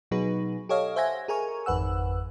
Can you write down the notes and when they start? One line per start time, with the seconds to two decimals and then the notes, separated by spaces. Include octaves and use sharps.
0.11 B2 F#3 D#4 G#4 B4
0.69 G4 A4 C#5 D#5 F5
0.96 C5 E5 F#5 G#5 G#6 A#6
1.28 G#4 A#4 G#5 C#6
1.66 G#1 F2 B4 F#5 E6